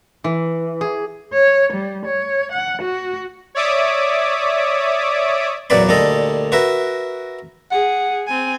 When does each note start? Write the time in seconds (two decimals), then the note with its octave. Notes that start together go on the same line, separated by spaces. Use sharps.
0.24 E3
0.81 G#4
1.34 C#5
1.73 G3
2.06 C#5
2.52 F#5
2.82 F#4
3.55 C#5 D5 E5 D6 D#6
5.70 E2 A#2 F#3 B4 D5 B5
5.89 D2 A#2 G3 A4 D#5
6.52 F#4 A#4 B4 E5
7.71 G#4 F#5
8.27 C4 G#5